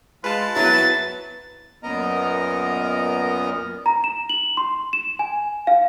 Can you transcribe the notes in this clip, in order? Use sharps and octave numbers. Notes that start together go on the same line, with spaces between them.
G#3 F4 B4 A5
F#3 B3 E4 A6
F#2 A#2 B3 A#4 D#5 A#5
A#5
E7
F#7
C6
E7
G#5
F5